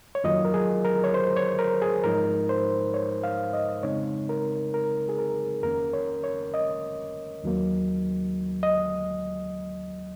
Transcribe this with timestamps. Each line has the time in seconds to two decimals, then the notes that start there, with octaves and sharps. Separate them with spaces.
0.15 C#5
0.24 F2 D#3 F#3 A#3 F4 D#5
0.45 A#4
0.54 G#4
0.85 A#4
1.04 C#5
1.14 C5
1.37 C#5
1.59 A#4
1.82 G#4
2.04 G#2 F3 G#3 D#4 A#4
2.49 C5
2.94 C#5
3.24 F5
3.54 D#5
3.83 F2 C#3 G#3 C4 D#4 C#5
4.29 A#4
4.74 A#4
5.09 G#4
5.18 A#4
5.63 F2 D#3 A#3 C#4 A#4
5.93 C#5
6.24 C#5
6.54 D#5
7.43 D#2 D#3 F#3 A#3
8.63 D#5